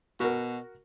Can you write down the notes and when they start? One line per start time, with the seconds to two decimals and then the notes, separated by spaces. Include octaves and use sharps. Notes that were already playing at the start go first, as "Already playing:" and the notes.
0.20 B2 F#4 A#4